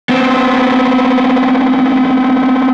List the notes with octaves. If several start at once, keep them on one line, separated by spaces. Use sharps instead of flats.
B3 C4